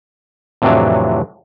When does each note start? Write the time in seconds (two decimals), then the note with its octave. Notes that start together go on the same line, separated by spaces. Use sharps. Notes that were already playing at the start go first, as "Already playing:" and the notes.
0.62 F2 A2 C3 E3 F#3 D4